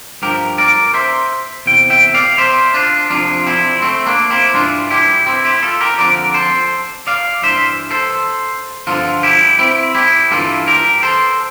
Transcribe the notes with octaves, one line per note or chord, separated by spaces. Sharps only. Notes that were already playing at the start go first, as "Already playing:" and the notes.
G2 F3 G4 A#4
A#4 D5
C5 E5
E2 C3 G5
E5 G5
D5 F5
C5 E5
D4 F4
F2 C3 F3 D4 F4
C4 E4
A3 C4
A#3 D4
C4 E4
G2 E3 D4 F4
E4 G4
C4 E4
E4 G4
F4 A4
G4 A#4
F2 D3 F3 A#4 D5
A4 C5
D5 F5
G2 E3 C5 E5
A4 C5
G2 D3 F3 F4 A4
E4 G4
C4 E4
E4 G4
G2 E3 F4 A4
G4 A#4
A4 C5